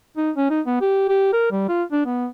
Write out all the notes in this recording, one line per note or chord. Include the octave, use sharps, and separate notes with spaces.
D#4
C#4
D#4
B3
G4
G4
A#4
G3
F4
D4
B3